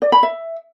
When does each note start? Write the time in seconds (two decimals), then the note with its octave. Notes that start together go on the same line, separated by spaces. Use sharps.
0.02 D5
0.12 B5
0.23 E5